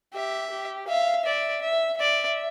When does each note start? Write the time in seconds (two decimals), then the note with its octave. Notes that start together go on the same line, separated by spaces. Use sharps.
0.14 G4 E5
0.51 G4
0.88 E5 F5
1.26 D5 E5
1.63 E5
1.99 D5 E5